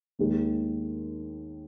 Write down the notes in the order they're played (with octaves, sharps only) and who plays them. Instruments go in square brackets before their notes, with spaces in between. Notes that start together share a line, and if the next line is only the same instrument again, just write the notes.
[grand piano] D#2 D#3 G#3